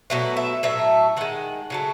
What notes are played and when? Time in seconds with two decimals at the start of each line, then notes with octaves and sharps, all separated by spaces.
0.10 B2 F#3 A3 F#5
0.37 E5
0.63 A2 F#3 A3 E5
1.17 D#3 G#3 F#5
1.70 C#3 F#3 A3